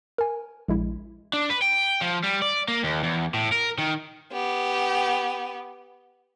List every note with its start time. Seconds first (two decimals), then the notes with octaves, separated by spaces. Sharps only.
0.18 A#4 G#5
0.68 A#1 G#3 E4
1.33 D4
1.50 B4
1.62 G5
2.02 F3
2.24 G3
2.42 D5
2.68 A#3
2.84 D#2
3.03 E2
3.34 A2
3.52 A#4
3.78 D#3
4.32 B3 G4